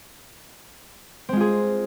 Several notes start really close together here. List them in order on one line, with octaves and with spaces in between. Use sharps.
C4 G#3 F4 G#4